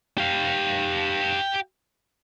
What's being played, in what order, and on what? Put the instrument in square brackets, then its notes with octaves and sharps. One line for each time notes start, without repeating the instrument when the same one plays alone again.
[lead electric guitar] G4 F5